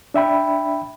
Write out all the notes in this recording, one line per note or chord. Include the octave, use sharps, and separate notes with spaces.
D4 E5 G5 B5